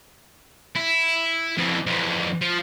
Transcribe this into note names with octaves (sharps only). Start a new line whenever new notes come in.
E4
F2 E3
F2 E3
F3